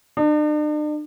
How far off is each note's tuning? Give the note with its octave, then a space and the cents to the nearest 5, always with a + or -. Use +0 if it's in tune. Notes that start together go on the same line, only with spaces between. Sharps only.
D4 +45